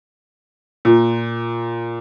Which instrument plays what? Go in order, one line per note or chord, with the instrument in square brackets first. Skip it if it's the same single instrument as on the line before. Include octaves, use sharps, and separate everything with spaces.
[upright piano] A#2